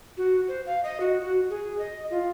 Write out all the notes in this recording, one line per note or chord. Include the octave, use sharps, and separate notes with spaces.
F#4
C5
F5
D#5
F#4
F#4
G#4
D#5
F4